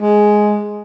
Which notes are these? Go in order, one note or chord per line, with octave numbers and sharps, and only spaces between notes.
G#3